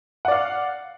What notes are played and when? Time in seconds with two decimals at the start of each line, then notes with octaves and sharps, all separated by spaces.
0.25 F#5
0.28 D5
0.32 F5